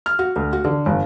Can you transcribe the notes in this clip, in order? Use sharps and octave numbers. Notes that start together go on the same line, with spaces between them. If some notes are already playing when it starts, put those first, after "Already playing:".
F6
F#4
D2
F#4
D3
G1